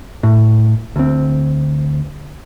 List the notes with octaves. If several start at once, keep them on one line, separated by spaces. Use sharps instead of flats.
A2
D2 C4